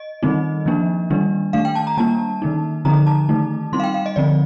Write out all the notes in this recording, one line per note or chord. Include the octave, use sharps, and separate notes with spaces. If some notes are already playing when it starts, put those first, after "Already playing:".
Already playing: D#5
D#3 G3 C4 D#4
F3 A#3 D4
D#3 G3 D4
D#3 A3 D4 F5
G5
A5
A#5
G3 A#3 D4 A5
D#3 A#3 D#4
D3 F3 C4 D#4 A#5
A5
D#3 A3 D#4
G3 C4 D#4 C6
F5
G5
F5
D#5
D3 F3 C4 D5